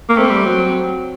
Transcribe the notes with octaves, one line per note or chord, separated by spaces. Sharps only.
A#3
A3 C4
G3
F#3